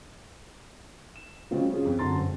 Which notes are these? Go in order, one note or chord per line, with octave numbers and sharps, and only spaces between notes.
E7
C#3 F#3 G#3 C4 F4
C#4 F4 G#4
F2
F#2 D3 A#5 C6 A6
G#2 C4